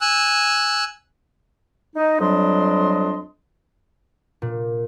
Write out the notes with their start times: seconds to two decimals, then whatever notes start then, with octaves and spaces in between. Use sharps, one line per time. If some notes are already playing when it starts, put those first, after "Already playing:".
0.01 G#5 E6 F#6
1.95 D#4
2.20 F2 F#3 G3 D4 D#5 C6
4.42 A#2